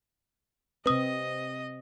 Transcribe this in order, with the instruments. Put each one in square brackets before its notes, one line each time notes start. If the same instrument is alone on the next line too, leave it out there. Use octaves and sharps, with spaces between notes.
[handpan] C3 C4 [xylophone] B4 D#6 [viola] D#5